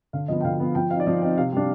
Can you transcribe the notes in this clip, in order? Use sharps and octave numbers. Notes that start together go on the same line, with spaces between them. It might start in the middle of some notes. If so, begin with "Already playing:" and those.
D3 F5
F3 B3 D#5
G5
D3 F5
F3 B3
F3 G5
C4 D#4 F5
D5
F3 D#5
C4 D#4
C3 F5
G3 D4